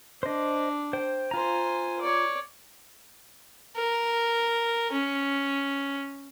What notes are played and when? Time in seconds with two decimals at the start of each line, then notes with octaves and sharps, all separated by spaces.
0.23 D4 C5 D#5
0.93 C5 G5
1.31 F4 C5 G#5 A#5
2.01 C#5 D5
3.76 A#4
4.92 C#4